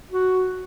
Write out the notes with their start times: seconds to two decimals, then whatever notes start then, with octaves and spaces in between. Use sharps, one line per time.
0.12 F#4